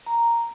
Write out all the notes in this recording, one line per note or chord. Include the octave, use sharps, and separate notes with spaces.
A#5